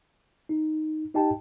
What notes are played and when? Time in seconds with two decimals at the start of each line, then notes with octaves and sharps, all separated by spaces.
0.49 D#4
1.14 D#4 G4 D#5 G5 A5